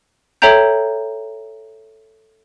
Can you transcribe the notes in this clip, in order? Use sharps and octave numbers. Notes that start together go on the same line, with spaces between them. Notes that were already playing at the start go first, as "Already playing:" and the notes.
A4 C#5 E5 G5 A#5 G6